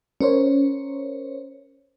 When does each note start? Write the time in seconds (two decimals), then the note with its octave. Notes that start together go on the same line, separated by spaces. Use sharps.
0.21 C#4 A#4 C5 C#5